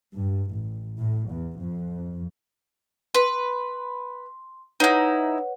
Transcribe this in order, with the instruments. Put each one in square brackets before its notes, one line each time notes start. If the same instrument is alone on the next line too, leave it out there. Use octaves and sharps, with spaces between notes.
[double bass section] G2
A1
A2
E2
F2
[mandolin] B4 [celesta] C6
[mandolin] D#4 E4 [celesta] B4 C#5 F#5